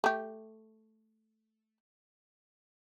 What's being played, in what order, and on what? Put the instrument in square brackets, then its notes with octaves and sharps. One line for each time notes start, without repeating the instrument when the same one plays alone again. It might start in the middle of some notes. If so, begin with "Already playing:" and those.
[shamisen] A3 G4